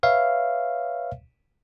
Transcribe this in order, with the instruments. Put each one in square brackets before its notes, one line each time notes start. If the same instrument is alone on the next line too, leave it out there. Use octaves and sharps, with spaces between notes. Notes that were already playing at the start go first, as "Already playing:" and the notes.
[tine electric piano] B4 C#5 E5 F5